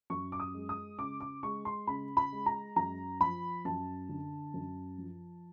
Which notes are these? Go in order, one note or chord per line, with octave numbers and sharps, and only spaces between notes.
F#2 C#6
D6
D#6
G#3
D#6
C#3 D6
D6
G#3 C#6
C6
C#3 B5
B5
G#3
A#5
F#2 A#5
F3 B5
F#2 A5
D3
F#2
F3